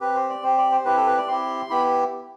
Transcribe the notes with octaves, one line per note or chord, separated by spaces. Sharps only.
C4 G4 B4
C5
D5
C4 G4 C5
D5
C5
C4 E4 G4 B4
A4
B4
D5
C4 E4 G4 C6
B3 E4 G4 B5